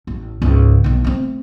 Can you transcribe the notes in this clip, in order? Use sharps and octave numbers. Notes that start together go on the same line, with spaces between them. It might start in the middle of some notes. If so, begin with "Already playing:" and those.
A1
C#2 G#2
B1 D#3
A3 C4